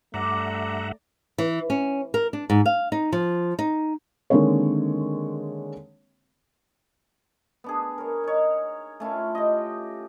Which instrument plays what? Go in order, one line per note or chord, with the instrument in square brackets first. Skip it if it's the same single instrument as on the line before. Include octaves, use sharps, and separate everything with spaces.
[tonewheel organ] G2 E5 F#5 [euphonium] A3 [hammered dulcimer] D5 [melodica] A#5
[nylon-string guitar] E3
C#4
A#4
D4
G#2
F5
D#4
F3
D#4
[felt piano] D3 D#3 G#3 A#3 C4 C#5
[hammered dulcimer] B3 D4 G#4
A#4 C#5
D#4 C#5
A3 C#4 E4 F4
G4 D#5